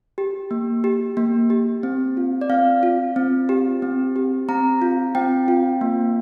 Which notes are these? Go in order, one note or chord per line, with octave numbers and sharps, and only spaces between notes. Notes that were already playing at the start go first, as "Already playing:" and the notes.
G4
A#3
G4
A#3
G4
C4
F4
D5
C4 F5
F4
C4
G4
C4
G4
C4 A#5
F4
C4 G5
F4
A#3